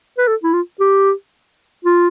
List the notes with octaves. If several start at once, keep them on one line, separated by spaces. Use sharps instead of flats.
B4
A4
E4
F4
G4
F4